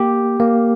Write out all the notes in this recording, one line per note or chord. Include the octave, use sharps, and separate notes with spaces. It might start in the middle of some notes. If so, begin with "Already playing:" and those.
Already playing: A#3 G4
A#3